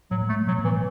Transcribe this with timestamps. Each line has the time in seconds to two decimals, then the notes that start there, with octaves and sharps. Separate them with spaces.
0.11 A2 F#3
0.29 A3
0.47 B2 F#3
0.59 A2
0.65 E3
0.71 B2